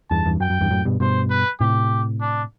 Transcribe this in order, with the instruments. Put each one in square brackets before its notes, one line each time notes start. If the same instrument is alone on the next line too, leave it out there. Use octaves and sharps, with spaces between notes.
[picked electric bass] E2 G2 [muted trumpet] A5
[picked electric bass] E2 G2
[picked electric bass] F#2 [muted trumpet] G5
[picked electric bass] F#2
E2 G2
F#2 A2
G2 B2
[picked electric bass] G2 B2 [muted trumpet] C5
[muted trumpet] B4
[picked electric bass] A2 C3 [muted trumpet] G4
[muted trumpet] D4